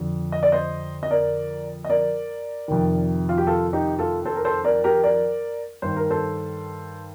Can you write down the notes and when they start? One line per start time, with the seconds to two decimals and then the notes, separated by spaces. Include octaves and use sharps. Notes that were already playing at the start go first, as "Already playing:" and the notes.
Already playing: F2 D3
0.32 D#5
0.43 D5
0.52 C5 D#5
1.03 D#5
1.11 A#4 D5
1.85 D#5
1.90 A#4 D5
2.68 F2 C3 D#3
3.29 F4
3.38 G4
3.47 F4 A4
3.73 D#4 G4
3.99 F4 A4
4.25 A4 C5
4.36 A#4
4.45 A4 C5
4.64 A#4 D5
4.84 G4 A#4
5.04 A#4 D5
5.82 G2 D#3 C5
5.97 A#4
6.10 A4 C5